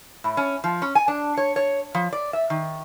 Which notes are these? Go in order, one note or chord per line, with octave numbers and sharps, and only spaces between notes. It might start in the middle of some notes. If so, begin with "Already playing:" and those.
A2
C#4
F3
C#4
G#5
D4
C#5
C#5
F3
D5
E5
D#3